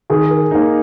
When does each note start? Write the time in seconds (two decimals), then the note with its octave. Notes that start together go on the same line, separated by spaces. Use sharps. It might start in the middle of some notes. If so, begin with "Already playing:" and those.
0.10 D#3 G#4
0.30 A#4
0.51 A#3 D#4 D#5